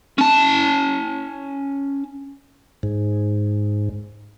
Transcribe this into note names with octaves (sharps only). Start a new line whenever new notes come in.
C#4 A5
G#2